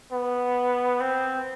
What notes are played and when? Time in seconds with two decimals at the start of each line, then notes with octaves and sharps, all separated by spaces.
0.12 B3
1.00 C4